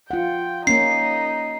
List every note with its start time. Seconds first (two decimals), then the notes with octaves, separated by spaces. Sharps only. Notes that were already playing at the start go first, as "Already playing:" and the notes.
0.11 F4 F#5 G5
0.67 A#3 C#4 D#4 C7